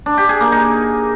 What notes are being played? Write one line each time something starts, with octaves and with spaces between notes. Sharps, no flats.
D4
G4
G#4
A#3
D#4